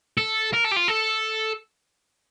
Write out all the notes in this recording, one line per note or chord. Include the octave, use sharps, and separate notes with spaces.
A4
A#4
A4
G4
F4
A4